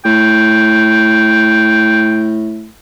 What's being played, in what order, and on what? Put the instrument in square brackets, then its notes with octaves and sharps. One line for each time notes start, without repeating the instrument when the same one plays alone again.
[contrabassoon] A2 [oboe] G5